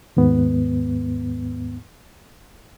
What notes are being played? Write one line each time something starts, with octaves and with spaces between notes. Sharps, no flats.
D#2 G#2 B3